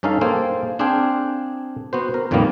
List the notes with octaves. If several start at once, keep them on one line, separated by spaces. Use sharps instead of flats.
G2 C#4 D#4 A4 F5
A#3 G#4 A4 C5 G5
C4 D4 G#4 C5 F5 G5
B3 F#4 C5
A#4
F2 A#2 D#3 G3 A#3 B3